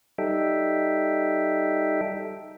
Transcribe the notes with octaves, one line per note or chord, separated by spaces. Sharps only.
G3 D#4 A4 E5 G5